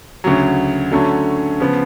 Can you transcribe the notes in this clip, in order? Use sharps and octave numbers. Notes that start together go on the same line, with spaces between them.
D2 C#3 F#3
D3 F#3 A3 C#4
C#3 F3 B3